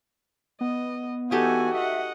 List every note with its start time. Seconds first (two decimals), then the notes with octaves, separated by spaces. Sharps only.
0.61 B3 D#5
1.31 E3 D#4 F#4 G4 A4 G#5
1.74 D#5 E5 F#5